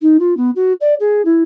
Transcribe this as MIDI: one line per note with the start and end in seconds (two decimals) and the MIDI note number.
0.02 0.17 63
0.19 0.36 65
0.37 0.50 59
0.56 0.73 66
0.81 0.94 74
1.00 1.22 68
1.25 1.43 64